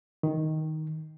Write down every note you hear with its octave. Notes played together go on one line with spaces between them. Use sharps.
D#3